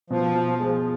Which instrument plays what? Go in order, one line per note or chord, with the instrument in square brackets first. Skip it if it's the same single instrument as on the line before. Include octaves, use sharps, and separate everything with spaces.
[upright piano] B2 [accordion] F3
[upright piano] F4
G#3